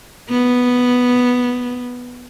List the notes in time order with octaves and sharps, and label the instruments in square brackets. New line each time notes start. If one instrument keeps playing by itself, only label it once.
[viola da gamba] B3